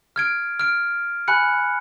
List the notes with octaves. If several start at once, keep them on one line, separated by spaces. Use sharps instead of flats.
F6 G#6 D7
F6 D7
G#5 B5 F#6 C#7